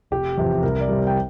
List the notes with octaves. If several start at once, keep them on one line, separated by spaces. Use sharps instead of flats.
F1 G4
E2 C3 F3
C2 A#4
D5
C3 G3
G5